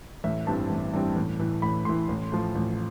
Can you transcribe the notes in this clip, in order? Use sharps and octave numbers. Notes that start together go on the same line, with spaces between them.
A1 E5
G2 E3 G3 C4 A5
A1
G2 E3 G3 C4
A1
A2 E3
A1 B5
A2 E3 C6
A1
A2 F3
A1